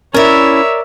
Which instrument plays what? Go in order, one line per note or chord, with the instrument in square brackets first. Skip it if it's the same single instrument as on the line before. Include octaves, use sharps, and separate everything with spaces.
[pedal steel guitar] C#4 E4 [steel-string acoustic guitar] A#4 D5 [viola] C#5 E5